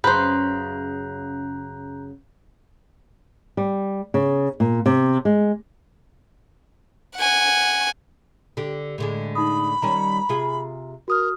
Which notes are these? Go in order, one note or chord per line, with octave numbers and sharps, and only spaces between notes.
F#2 C#3 B4 C5 A#5 F#6 G6
G3
C#3
A#2
C3
G#3
F#5 G#5
D3 G4
A2 D3 G#3
D#4 B5 D#6
D#3 G3 C#4 A#5
C3 F4 G#4
F#4 A#4 D#6 F6